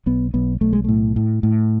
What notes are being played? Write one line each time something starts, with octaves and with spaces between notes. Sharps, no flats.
B1 B3
B1 B3
B1 A3
G#3
A2 A3
A2
A2